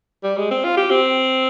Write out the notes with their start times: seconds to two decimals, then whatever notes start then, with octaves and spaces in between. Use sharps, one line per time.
0.23 G3
0.37 G#3
0.51 C4
0.64 F4
0.77 G4
0.90 C4